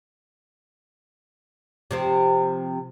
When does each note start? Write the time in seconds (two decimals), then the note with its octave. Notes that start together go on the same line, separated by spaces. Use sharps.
1.91 C3 F3 C4